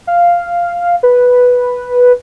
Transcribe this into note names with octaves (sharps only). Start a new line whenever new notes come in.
F5
B4